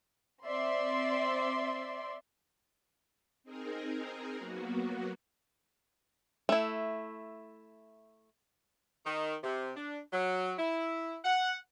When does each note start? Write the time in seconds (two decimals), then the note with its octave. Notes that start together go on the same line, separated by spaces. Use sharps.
0.45 C4 D5 E5 C6
3.44 C4 D#4 G#4 A#4
4.37 F#3 A#3 B3 F#4
6.49 A3 E4
9.06 D#3
9.44 C3
9.76 D4
10.13 F#3
10.59 E4
11.25 F#5